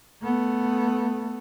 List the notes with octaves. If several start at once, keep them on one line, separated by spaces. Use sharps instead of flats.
A3 B3